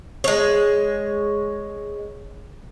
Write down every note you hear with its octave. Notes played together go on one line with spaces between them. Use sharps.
G#3 C#5